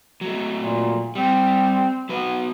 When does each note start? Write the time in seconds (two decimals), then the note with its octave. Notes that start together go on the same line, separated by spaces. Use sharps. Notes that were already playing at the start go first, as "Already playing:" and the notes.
0.21 F#3 A3
0.57 A#2
1.15 G3 C4
2.09 F#3 B3 B4